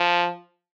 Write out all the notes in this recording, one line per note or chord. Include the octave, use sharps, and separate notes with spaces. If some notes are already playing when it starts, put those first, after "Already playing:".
Already playing: F3